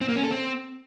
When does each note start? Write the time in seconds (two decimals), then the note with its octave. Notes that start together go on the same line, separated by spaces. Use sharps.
0.01 C4
0.09 A#3
0.16 C#4
0.23 A4
0.31 C4